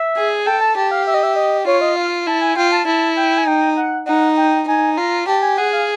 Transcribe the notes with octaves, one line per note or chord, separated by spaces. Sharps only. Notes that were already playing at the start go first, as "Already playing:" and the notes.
Already playing: E5
G#4
A4 G5
A5
G4 A5
F5
E5
D#5
E5
D#5
F4 C#5
D#5
F5
E4 A5
G#5
F4 G5
A5
E4 A5
G5
G#5
D#4 G5
F#5
D#4 F#5
G5
D#4 G#5
F4 A#5
G4 A5
G#5
G#4 F#5
F5